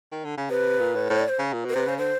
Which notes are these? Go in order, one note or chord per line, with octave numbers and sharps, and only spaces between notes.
D#3
D3
C#3
C3 B4
A#2
A2
A2 C5
D5
C5
C#3
A#2
B2 A#4
C3 B4 C5
C#3 C5
D3 C5